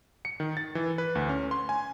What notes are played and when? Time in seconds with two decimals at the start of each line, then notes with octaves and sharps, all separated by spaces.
0.25 C#7
0.40 D#3
0.57 A6
0.75 E3
0.98 B4
1.15 D2
1.29 C#4
1.51 C6
1.69 G#5